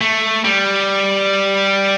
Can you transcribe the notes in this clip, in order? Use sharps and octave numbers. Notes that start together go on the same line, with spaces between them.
A3
G3